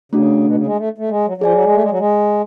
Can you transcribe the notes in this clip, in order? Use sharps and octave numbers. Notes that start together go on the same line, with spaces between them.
C#3 A3 D4 F#4
B2
C#3
G#3
A3
A3
G#3
F#3
F#3
F3 G#4 D5 G#5
F#3
G#3
A3
G#3
F#3
G#3